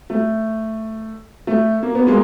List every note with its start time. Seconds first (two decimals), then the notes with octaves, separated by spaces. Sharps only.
0.10 A3
1.47 A3
1.83 A#3
1.95 B3
2.07 G#3 A#3